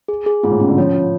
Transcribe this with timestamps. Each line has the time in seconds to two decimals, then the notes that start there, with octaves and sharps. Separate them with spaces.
0.08 G#4
0.26 G#4
0.43 G#2 F4
0.51 A2
0.60 B2 C#4
0.69 D3
0.78 F3 C#5
0.94 F4